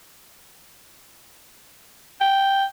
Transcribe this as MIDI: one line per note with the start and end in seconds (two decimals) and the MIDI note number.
2.21 2.65 79